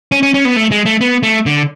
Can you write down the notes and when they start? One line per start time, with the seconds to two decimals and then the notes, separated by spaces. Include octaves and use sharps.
0.12 C#4
0.23 C#4
0.34 C#4
0.45 B3
0.56 A3
0.71 G#3
0.85 A3
1.01 B3
1.23 A3
1.46 D3